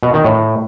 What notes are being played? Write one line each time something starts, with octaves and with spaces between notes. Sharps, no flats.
B2
D#3
A2